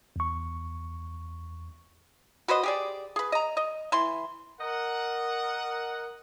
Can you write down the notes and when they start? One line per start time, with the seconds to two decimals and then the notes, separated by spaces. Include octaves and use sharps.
0.16 E2 C#6
2.48 F#4 B4 C5 D#5
2.63 G4 G#4 D5
3.16 G#4 B4
3.32 D#5 A#5
3.57 D#5
3.92 E3 C6
4.59 A#4 D#5 F#5